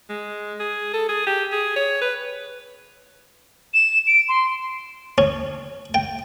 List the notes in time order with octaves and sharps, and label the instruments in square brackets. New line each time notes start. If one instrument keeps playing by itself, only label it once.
[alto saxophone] G#3
G#4
A4
G#4
G4
G#4
C#5
B4
[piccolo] E7
D7
C6
[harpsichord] C#4
G5